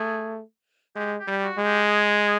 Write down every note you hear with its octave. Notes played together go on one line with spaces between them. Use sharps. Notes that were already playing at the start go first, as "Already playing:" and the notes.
Already playing: A3 G#4
G#3 G4
G4
G3
F#4
G#3
G4
G#4